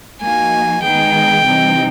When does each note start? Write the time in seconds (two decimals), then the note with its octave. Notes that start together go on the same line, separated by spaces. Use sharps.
0.22 F3 A#3 D#4 F#4 G#5
0.83 D#3 G#3 B3 D#4 G#4 G5
1.46 C3 E3 G3 C4 D#4